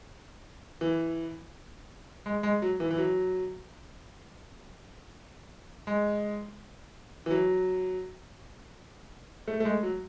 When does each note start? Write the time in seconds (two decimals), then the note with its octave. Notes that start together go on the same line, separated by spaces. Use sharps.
0.81 E3
2.26 G#3
2.43 G#3
2.62 F#3
2.80 E3
2.91 E3
2.98 F#3
5.87 G#3
7.26 E3
7.31 F#3
9.48 A3
9.60 A3
9.65 G#3
9.83 F#3